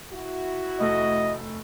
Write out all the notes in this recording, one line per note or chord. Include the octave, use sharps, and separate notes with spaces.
E4 F#4
F1 A3 D#5